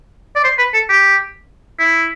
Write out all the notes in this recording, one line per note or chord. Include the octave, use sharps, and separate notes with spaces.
D5
C5
B4
A4
G4
E4